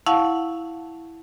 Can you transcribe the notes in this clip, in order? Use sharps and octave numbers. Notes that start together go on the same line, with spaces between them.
E4 F5 F#5 A5 C#6